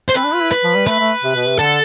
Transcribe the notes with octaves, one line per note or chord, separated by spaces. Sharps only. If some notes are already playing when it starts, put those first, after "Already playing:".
C5
C4 B4
D4
F4
E4
B4
F3
G3
A3 B4
A3
C3
B2
C3
D3 A4